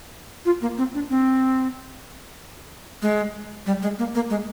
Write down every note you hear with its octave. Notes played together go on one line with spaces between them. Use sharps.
F4
A#3
C4
D4
C4
G#3
G3
G#3
A#3
A#3
G#3